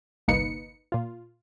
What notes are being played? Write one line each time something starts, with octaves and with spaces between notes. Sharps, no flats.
G1 C2 A#3 D#4 B4 C#7
A#2 F4